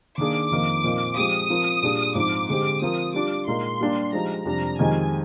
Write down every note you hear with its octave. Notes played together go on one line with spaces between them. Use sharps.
D#3 A#3 D4 G#4 D6
F2 D#3 A#3 D#4 A#4
A#2 F3 C4 D#4 A#4
F3 G#3 C4 G4 D#6
F3 C4 F4 A#4
A#2 G3 D4 G#4
G#2 F3 C4 D6
D3 G#3 C4 G4 D6
F3 C4 F4 A#4 D#6
G3 D4 F4 D6
A#2 G#3 D#4 A#4 C6
G3 A#3 D4 G4
F3 G#3 D#4 G4 A#5
F2 C3 G3 D4 A#5
F2 D#3 G#3 D#4 G4 G#5